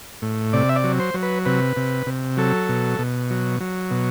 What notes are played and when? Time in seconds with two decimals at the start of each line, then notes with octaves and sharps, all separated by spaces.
0.22 A2
0.53 C3 D5
0.69 E5
0.76 D5
0.84 F#3
1.00 C5
1.14 F#3
1.23 B4
1.45 C3 B4
1.77 C3
2.06 C3
2.37 F#3 A4
2.69 B2
2.99 B2
3.31 F#3
3.61 F#3
3.91 B2